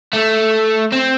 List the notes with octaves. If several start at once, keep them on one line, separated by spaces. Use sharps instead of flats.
A3
C4